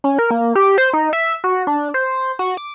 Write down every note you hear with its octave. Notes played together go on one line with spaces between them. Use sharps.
C#4
A#4
A#3
G4
C5
D#4
E5
F#4
D4
C5
F#4
D6